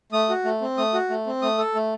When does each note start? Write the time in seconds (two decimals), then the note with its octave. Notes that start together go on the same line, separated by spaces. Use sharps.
0.12 A3 D#6
0.29 F#4
0.44 A3
0.61 C4
0.77 A3 D#6
0.94 F#4
1.10 A3
1.27 C4
1.42 A3 D#6
1.58 A4
1.75 A3